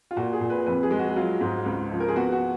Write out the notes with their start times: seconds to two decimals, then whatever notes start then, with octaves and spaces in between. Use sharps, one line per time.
0.11 F4
0.16 A#2 F#4
0.33 G#4
0.41 A#2
0.50 B4
0.66 F2 B4
0.83 G#4
0.91 G#3
0.99 F#4
1.16 F#3 F4
1.41 G#2
1.66 C#2
1.91 F3
2.00 A#4
2.08 G#4
2.16 B3 F#4
2.32 F#4